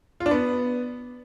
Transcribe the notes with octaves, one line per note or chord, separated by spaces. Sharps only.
F4
D4
B3